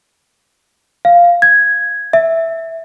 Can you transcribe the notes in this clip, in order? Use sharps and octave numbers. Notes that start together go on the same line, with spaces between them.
F5
G#6
E5